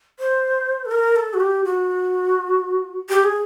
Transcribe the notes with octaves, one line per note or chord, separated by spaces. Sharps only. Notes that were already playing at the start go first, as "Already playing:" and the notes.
C5
A4
A#4
A4
F#4
G4
F#4
G4
G#4